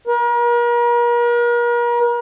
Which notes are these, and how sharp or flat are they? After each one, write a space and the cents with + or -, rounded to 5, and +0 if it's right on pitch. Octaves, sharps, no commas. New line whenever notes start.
A#4 +40